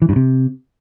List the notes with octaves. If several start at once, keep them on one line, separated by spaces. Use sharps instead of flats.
E3
G2
C3